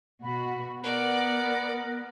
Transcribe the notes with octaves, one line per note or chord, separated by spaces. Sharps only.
B2 F#4 B5
B3 A#4 D5 F#5